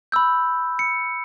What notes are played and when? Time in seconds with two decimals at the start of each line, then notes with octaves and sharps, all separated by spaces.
0.12 B5 E6 G6
0.79 C#7